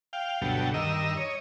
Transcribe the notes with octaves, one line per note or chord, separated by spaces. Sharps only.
F5 G5
D2 G2 B2 F#3 A4 G5
G2 D#3 A#4 D#5 E6
C#5 D#5